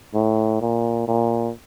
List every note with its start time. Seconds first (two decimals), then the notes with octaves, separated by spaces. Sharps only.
0.14 A2
0.61 A#2
1.08 A#2